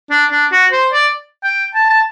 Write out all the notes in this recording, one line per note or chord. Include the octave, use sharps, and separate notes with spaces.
D4
D4
F#4
C5
D5
G5
A5
A5